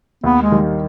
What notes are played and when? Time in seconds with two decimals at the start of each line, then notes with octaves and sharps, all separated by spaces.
0.23 D#2 B3
0.42 G#3
0.52 D#3 G3